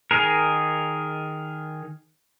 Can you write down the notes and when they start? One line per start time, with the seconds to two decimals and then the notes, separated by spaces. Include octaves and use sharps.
0.11 D#3 G#4 A#4